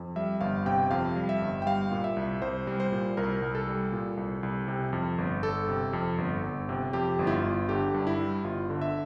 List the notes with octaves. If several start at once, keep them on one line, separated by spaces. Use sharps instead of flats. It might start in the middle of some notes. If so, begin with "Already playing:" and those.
Already playing: F2
G3 E5
G1 F5
C3 G5
F2 F5
G3
E5
G1
G5
G3 F5
A#2
E5
C2
C2 C5
G3
C5
A#2
C2 A#4
C2
A4
G3
A#2
C2
C2
C3
F2
G1
G1 A4
C3
F2
G1
G1
C3
F2 G4
G1
E4
F4
G1
D3 G4
G2
E4
G3
G1 F4
D3
E5